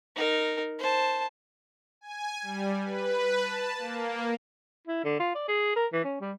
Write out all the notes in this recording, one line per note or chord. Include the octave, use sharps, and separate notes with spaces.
D#4 A#4
C5 A5
G#5
G3
B4
A5
A#3
E4
D3
F4
D5
G#4
A#4
E3
C#4
G3